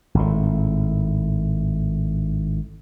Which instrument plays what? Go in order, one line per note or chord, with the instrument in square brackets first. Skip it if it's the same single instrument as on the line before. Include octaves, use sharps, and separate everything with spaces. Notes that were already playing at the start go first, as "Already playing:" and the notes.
[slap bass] G#1 A2